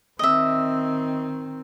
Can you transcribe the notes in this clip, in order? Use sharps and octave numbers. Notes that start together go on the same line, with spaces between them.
D#3 C4 D#5 E5